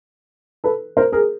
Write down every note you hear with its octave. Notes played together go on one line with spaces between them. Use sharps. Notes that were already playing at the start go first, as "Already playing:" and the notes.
A4 B4
A#4 C5
G#4 A#4